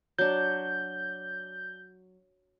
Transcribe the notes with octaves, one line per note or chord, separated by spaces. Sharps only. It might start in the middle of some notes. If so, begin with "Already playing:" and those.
F#3 D4 G6